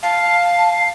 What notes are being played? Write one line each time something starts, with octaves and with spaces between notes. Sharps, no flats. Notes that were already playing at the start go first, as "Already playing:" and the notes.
F5 A5